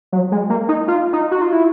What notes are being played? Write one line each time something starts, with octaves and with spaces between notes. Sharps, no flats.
F#3
G#3
A#3
D#4
F4
D#4
F#4
F4
E4